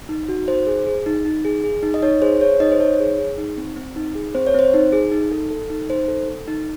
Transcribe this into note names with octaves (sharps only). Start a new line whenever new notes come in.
D#4
F#4
D#4 C5
G#4
G#4
D#4
D#4
G#4
G#4
D#4
D#5
D#4 C#5
G#4 C5
G#4 C#5
D#4 D#5
C5
D#4 C#5
G#4
G#4
D#4
C4
C4
D#4
G#4
C4 C5
C#5
C4 C5
D#4
G#4
D#4
A4
A4
D#4
D#4 C5
A4
A4
D#4